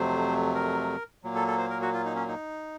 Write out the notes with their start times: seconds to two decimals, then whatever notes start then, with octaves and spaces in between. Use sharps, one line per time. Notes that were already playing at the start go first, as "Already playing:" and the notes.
Already playing: F2 C3 F#3 A3 C5
0.55 A#4
1.24 A#2 F#3 A#3
1.35 A4
1.47 A4
1.58 C5
1.70 A#4
1.82 F#4
1.94 F4
2.05 D#4
2.16 C#4
2.28 D#4